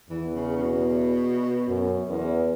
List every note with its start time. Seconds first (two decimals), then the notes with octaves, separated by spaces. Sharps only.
0.09 E2 E3
0.36 C#3
0.56 C#3
0.62 B2
1.68 F#2
2.09 E2